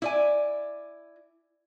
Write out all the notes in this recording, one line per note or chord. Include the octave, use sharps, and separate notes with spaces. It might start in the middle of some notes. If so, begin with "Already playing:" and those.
E4 D5 G#5